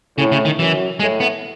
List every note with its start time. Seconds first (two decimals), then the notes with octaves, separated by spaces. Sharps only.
0.18 A2 C#3
0.32 C#3
0.45 D#3
0.59 F#2 E3
1.00 A2 G#3
1.20 B3